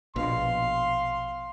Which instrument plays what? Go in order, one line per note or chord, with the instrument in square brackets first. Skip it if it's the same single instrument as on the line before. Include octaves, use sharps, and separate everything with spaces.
[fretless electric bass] A#1 B2 [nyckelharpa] F5 [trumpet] C6